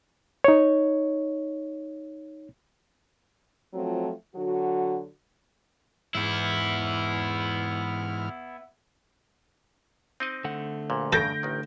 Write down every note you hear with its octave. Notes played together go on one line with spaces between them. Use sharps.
D#4 C#5
F3 F#3 A3 C4 F4
D3 F#3 F#4
G#2 E3 B3 E4 F6
C4 D#4 D#5
D3 A3 F#5
A#1 A#2
G2 C#3 A4 G6 A#6 D7
A1 D#3